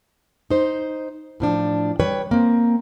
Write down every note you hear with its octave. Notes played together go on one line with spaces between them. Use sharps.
D#4 C5
A2 F3 D4
G3 B4 C#5 G5
A#3 C4